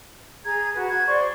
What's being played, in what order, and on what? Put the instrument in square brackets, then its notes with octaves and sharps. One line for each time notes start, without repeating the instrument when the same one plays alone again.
[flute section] G#4 A#5 G#6
F#4 B4
G#6
C5 D5 C6 C#6